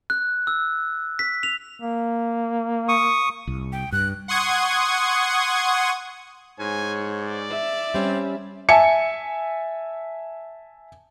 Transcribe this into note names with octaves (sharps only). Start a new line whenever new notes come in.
F#6
E6
B6
F7
A#3
C#6 D#6
C2
G5
G2 F#6
F#5 C6 C#6 D#6 G#6
G#2 C#5 G#5
D5
E5
G3 C4 C#4
E5 G#5 A5 C#7